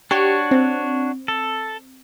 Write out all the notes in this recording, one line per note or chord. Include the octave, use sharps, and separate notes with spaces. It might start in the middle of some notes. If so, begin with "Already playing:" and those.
D4 F#4 G4 C#5
C4
A4